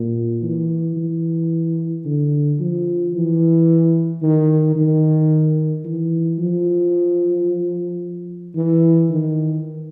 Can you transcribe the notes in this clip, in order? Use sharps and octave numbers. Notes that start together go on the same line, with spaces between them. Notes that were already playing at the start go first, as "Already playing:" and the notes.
Already playing: A#2
E3
E3
D3
F3
E3
D#3
D#3
E3
F3
E3
D#3